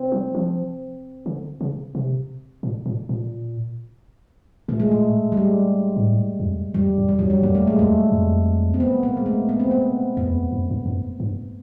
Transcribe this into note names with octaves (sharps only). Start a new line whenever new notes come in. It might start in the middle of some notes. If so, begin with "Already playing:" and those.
Already playing: C4
F#3
F3
D3
C#3
C3
A#2
A#2
A#2
A#2 A3
G#3
A3
G3
G#3
G#2
A2
F2
F2 G3
F2
G3
E2 F#3
G3
F2 A#3
A3
G#3
E2 A3
F2
C4
B3
A#3
G#3
A3
B3
C4
B3
E2 B3
F2
E2
F2
F#2
F2
F#2
G2